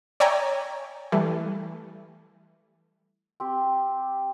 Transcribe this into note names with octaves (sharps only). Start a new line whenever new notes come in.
C#5 D5 E5 G5 G#5 A#5
E3 G3 A3
C4 G4